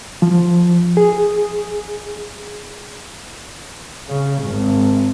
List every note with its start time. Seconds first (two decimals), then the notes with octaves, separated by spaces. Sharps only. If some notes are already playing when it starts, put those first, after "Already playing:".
0.22 F3
0.97 G#4
4.07 C#3
4.42 G#1